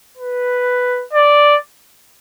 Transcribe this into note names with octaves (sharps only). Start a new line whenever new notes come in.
B4
D5